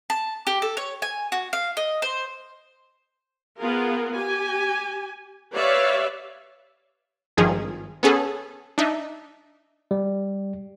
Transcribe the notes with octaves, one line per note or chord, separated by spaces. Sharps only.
A5
G4
A4
C#5
G#5
F#4
F5
D#5
C5
B3 F4 G#4 A#4
G4 G#5
G4 B4 C#5 D5 E5 F5
G#1 G2 D#3 F3 G#4
B3 C#4 G#4 A4
D4 D#4 E5
G3